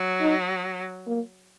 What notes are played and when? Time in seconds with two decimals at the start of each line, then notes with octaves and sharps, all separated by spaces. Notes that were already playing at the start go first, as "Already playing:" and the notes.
Already playing: F#3
0.21 D#4
1.07 A#3